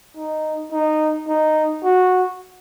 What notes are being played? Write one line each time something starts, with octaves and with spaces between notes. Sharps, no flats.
D#4
D#4
D#4
F#4